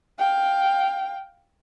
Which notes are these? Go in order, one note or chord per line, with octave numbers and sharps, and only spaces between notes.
F5 G5